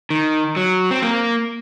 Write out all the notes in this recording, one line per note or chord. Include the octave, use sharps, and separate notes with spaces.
D#3
F#3
C4
A#3